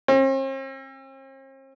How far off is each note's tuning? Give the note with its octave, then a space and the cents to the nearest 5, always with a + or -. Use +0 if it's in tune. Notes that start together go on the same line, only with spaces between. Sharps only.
C4 +45